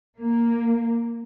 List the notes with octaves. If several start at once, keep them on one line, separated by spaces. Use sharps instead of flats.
A#3